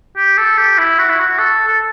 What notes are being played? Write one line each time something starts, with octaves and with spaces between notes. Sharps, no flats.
G4
A4
G4
E4
F#4
E4
F#4
A4
A4